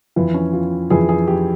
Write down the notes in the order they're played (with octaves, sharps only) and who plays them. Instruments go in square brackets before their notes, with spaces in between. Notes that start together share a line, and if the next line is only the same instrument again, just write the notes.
[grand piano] F2 E3 F4
C#4
F4
F2 E3 G#4
G#4
G4